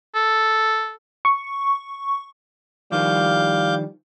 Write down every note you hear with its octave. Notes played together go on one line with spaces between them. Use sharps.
A4
C#6
D#3 F3 G3 F5 D6 G6